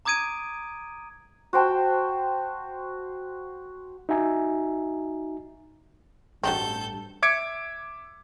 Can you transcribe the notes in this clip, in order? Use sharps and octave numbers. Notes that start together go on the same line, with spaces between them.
A#5 D6 D#6 G#6 D7 D#7
F#4 C5 G5 A5
D#4 F#4 E5 G#5 A#5
A1 G2 F#3 G3 C4 A4 G6
E5 D6 G#6 C#7 D7